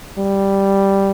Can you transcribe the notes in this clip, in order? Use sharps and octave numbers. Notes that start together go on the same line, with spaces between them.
G3